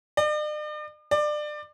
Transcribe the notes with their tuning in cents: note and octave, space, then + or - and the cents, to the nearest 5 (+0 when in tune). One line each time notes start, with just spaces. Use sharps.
D5 +45
D5 +25